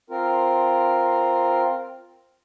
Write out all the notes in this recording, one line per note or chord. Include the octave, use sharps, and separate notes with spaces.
C4 F4 A#4